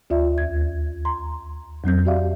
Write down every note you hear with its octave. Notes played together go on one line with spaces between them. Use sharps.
D2 F4 D5 E5
D#2 G#6
A#5 C6
F2 F#3 C4 G6
F#4 G4 D5 E5 F5